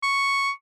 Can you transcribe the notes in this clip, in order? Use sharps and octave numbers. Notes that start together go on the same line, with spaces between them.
C#6